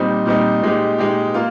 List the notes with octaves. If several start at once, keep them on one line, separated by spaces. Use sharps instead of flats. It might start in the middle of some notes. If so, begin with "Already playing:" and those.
Already playing: A#2 G3 C4 D#4
A#2 G3 C4 D#4
A#2 G#3 D#4 G4
A#2 G#3 D#4 G4
A#3 F4